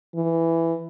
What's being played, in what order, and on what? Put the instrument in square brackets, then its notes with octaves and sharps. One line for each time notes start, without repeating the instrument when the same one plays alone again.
[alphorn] E3